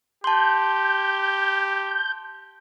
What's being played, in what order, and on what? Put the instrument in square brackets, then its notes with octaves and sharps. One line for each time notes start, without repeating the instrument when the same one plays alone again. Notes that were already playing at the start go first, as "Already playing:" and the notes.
[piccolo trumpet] G4 [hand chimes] A5 C6 [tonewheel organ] G6